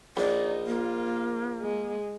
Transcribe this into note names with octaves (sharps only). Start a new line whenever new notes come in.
A#1 D#4 D5
A#3 F4
G#3